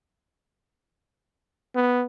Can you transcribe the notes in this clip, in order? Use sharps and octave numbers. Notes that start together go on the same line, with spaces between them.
B3